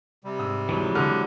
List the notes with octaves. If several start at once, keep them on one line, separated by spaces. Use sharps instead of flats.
C3 G3
G#2 D#6 E6
F1 E3 F#3 G#3
D3 D6 D#6 F6